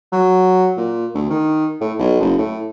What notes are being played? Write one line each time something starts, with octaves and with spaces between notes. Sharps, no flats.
F#3
A#2
D2
D#3
A2
B1
F#1
A2